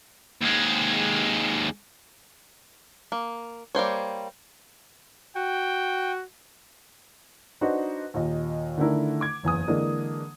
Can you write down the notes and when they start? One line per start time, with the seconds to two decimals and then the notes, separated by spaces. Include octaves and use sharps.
0.42 D#2 G#3
3.12 A#3
3.75 G3 A#3 C5 C#5
5.36 F#4 G5
7.61 D4 D#4 F#4 B4 C5
8.14 D#2 A#2 D#5
8.78 D3 D#3 A3 D4 E4 A#4
9.21 D6 G#6
9.43 F#1 E2 G#5 D#6
9.68 D3 E3 G#3 A#3 D4